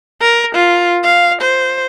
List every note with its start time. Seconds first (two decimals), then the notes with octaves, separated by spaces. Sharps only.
0.21 A#4
0.55 F4
1.04 F5
1.42 C5